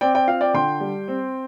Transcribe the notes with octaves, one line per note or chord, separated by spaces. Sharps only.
C4 D5 G5
D5 G5
F4 F5
D5 G5
D3 G5 C6
G3
C4